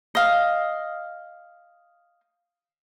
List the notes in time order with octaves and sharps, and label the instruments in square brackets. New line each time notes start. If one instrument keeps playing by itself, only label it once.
[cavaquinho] D#5 F5